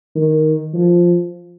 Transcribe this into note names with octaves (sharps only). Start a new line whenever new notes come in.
D#3
F3